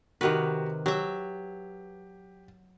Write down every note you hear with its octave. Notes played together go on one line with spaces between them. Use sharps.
C3 D#3 F#4 G4 B4
F#3 G4 E5